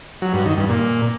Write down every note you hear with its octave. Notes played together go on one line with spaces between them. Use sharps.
F#3
G2
D#3
G2
A#2